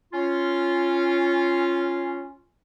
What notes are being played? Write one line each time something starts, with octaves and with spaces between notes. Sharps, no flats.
C#4 F4